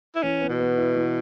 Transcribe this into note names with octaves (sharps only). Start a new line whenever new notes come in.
E4
E3 C#4
B3
B2
B3
E4
E3